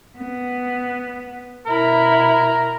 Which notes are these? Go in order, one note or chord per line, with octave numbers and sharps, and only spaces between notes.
B3
B2 E4 A#4 B5